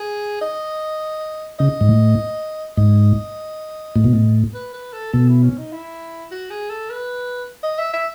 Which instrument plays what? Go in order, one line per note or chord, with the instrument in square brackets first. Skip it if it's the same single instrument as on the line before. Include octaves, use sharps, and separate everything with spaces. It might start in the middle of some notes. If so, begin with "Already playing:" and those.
Already playing: [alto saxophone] G#4
D#5
[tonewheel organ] C#3 [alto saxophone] D#5
[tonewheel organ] G#2
A2
[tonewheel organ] G#2 [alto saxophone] D#5
[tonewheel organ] A2
B2
A2
[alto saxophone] B4
B4
A4
[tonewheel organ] B2 [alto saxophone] A4
[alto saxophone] E4
C#4
D#4
E4
F#4
G#4
A4
B4
D#5
E5
E5